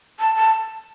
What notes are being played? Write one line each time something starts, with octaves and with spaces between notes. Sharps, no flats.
A5
A5